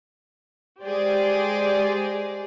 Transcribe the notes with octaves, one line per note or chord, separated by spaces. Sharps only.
G#3 G4 G#4 C5 D5